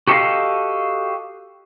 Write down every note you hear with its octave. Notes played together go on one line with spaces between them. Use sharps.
F#4 G4 A4 A#4 D#5 F5